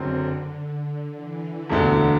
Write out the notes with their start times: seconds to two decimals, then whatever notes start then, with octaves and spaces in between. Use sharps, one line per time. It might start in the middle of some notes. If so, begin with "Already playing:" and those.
Already playing: F#1 D3 F#3 C4
1.14 E3
1.70 E1 D2 D3